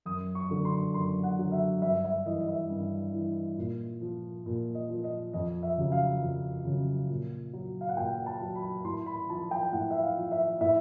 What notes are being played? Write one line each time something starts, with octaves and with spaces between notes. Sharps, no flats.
F#2 D#6
C#6
D3 F#3
C6
F#2 C6
F#5
D3 F#3
E5
G2 E5
E5
E3 D#5
D#5
E5
G2
E3
A#2
F3
A#2
D#5
F3
D#5
F2 D#5
E5
C#3 F#3
F5
F2
C#3 F#3
A#2
F#3
F5
F#5
A#2 G5
A5
F#3
B5
A2 C6
B5
F3 A5
G5
A2 F#5
E5
F5
F3
E5
A2 E5